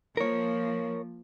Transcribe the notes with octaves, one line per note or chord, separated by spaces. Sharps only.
F3 A#3 A#4 C#5